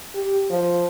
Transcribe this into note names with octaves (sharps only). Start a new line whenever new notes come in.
G4
F3